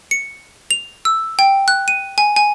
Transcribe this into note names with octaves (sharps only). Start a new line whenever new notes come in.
C#7
F7
E6
G5
F#6
D#7
G#5
G#5